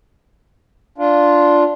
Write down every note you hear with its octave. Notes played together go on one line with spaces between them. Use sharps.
D4 F4